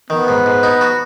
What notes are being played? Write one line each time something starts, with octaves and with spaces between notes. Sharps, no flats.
D#3 B3
G#2
G#2
D#4
F#4